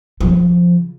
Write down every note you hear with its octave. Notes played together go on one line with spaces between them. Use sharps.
C#3 F3